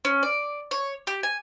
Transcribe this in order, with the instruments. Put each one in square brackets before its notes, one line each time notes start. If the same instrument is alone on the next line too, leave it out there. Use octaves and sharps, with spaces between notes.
[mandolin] C#4
D5
C#5
G4
G#5